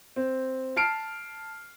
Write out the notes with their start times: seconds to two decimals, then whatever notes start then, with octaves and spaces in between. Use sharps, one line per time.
0.16 C4
0.76 A5 F6 C7 D7